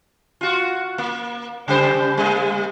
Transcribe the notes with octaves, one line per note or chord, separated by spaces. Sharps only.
F4 F#4
A#3
C#3 G3 C5
G3 A#3